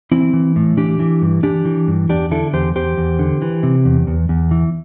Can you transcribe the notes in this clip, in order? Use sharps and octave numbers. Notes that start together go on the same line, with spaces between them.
E3 C4 E4
E3
A2
E3 D4 G4
E3
G2
E3 D4 G4
E3
G2
E2 D4 G4
D3 E4 A4
E2 G4 C5
E2 G4 C5
E2
D3
E3
C3
E2
E2
E2
E3